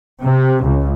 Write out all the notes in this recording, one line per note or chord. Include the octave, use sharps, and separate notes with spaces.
C3
C#2